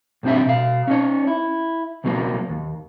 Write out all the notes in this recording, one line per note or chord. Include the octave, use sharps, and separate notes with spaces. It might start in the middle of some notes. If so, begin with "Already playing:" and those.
B1 G2 C4 D4 G4 E5
B2 F5
C#4 D#4 C#5
E4
C#2 B2 F#3 A3 A#3
D#2